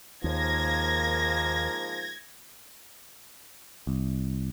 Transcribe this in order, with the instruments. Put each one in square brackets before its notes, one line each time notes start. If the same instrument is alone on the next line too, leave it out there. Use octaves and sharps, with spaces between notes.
[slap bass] D#2 [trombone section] G#2 F3 A#3 [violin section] G#6 A#6
[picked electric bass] C2